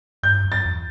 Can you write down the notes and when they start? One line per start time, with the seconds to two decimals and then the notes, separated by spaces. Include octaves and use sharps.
0.23 G2 G6
0.44 F#2
0.52 A6
0.65 E2